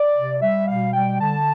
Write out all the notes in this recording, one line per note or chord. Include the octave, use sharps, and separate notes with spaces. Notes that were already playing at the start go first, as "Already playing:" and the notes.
Already playing: D5
C3
G3 E5
B2 F5
G3 G5
D3 A5